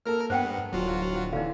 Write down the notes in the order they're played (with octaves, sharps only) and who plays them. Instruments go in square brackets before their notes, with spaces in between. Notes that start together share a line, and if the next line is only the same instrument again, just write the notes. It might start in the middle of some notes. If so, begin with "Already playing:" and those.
[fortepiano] A#3 A4 [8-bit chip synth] A#4 F6
[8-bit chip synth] G2 B3 [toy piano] C5 F#5 G5
[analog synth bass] D1 [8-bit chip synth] F#3 F4 F#4
[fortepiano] D3 E3 [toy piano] D#4 F5